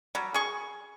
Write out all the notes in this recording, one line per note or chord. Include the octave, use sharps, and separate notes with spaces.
F#3 G3
G#4 C#6